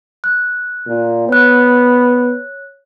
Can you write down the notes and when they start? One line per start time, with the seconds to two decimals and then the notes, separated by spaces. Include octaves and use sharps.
0.24 F#6
0.87 A#2
1.29 B3 C#5 F#6